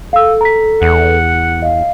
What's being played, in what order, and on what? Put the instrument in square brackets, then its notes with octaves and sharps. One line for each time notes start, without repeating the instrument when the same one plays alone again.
[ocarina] A4 [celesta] F5 E6
[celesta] A#5 B6
[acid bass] E2 [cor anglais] F#5
[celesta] D#5 [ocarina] F5